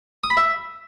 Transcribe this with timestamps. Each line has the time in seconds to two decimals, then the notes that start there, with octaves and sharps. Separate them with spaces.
0.24 D#6
0.30 B5
0.37 E5